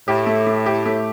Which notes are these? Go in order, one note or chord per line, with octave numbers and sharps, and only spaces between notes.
A2 G4
A3
A3
G4
A3